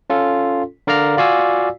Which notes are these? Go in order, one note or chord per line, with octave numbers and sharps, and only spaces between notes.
C#4 F4 A4
D3 A#4 D5 F5 A#5 F6
F4 F#4 D5 F5 G#5 E6